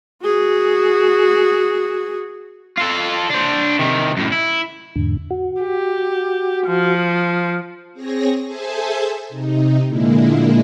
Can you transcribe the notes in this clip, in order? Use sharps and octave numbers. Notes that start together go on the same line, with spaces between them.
F#4 G#4
F4 A4
D4 C5
C3 D#3
F#2 A2
E4
E2 G#2 D3
F#4
G4
F3
C4 G#4 C#5 A#6
G#4 A4 C5 E5 G#5 A5
C3 D#4
A#2 D3 G#3 A#3 E4